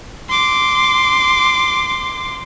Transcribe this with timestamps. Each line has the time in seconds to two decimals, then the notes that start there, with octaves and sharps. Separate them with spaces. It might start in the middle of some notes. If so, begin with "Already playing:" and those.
0.29 C6 D6